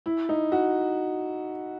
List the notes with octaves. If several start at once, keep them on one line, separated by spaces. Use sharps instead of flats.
E4
D#4
F#4